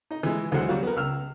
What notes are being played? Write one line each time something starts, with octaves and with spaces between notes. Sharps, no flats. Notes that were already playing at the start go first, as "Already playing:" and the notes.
D#4 D#5
E3 G#3
D2 E3 F#3 G#3 C5 F#5
F#3 G3 F#4 F5
B3 A#4
C#2 E6 F6